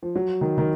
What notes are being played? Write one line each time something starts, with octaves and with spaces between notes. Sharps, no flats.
F3
F#3
D#3
D#3